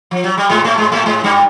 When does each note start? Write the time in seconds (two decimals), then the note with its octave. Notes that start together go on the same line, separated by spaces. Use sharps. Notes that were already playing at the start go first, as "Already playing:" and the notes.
0.11 F3
0.24 F#3
0.38 G3
0.49 G#2 G#3
0.64 A2 A3
0.78 G#2 G#3
0.92 A2 A3
1.06 G#2 G#3
1.24 G2 G3